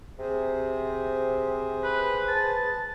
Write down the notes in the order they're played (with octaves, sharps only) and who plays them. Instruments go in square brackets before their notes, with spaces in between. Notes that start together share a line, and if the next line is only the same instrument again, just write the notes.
[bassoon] C3 [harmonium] G#4 C5
[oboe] B4
[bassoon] B4 [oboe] A5